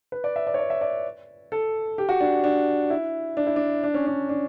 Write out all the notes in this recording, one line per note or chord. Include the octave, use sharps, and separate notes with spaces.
B4
D5
E5
D5
C#5
D5
E5
D5
A4
G4
F#4
D4
D4
E4
D4
E4
D4
D4
C#4
D4
D4